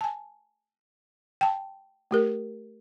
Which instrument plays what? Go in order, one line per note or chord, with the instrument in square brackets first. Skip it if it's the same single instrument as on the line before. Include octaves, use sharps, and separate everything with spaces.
[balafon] G#5 A5
G5 A5
A3 G4 A#4